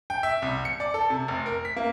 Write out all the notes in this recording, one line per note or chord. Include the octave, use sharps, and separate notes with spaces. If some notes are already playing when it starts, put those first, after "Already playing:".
G5
E5
C2
C#7
D5
A4
C3
F1
A#4
B6
A#3